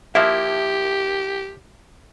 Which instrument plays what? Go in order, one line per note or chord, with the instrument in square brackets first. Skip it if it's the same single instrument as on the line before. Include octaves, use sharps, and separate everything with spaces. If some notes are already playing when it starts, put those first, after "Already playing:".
[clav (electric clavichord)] F3 A#3 E4 [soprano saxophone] G4 [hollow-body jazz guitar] E5